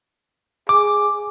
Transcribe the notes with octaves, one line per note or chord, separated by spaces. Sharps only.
G#4 D6